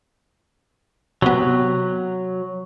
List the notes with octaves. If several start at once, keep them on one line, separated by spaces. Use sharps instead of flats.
C3 F#3 B3